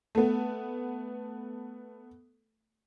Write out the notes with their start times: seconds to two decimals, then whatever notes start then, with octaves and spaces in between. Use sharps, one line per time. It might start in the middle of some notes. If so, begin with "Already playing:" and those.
0.15 A3 B3